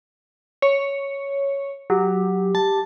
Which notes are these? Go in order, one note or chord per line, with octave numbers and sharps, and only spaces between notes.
C#5
F#3 G4
A5